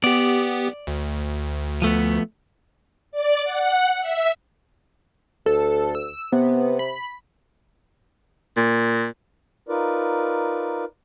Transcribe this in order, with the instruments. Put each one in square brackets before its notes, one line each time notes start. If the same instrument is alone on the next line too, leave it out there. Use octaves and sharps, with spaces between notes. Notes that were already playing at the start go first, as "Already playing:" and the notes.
[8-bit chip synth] B3 G4 [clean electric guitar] D5
[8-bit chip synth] D2
[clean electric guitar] F3 A3 B3
[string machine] D5
F#5
E5
[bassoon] D2 [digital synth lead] A4
[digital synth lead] E6
[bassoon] C3 [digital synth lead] B3
[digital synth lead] B5
[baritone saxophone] A#2
[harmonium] D#4 F4 A#4 B4 D5